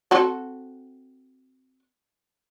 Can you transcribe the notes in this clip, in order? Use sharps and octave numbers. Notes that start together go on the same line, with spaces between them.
C4 F#4 A4